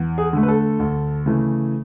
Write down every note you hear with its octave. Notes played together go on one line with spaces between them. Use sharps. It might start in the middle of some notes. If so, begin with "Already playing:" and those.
Already playing: E2
G#4
D3 A3
B4
A4
D2
C#3 E3 A3